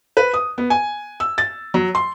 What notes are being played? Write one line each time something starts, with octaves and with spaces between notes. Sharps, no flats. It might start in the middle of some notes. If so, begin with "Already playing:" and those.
B4
D#6
B3
G#5
E6
A6
F#3
C6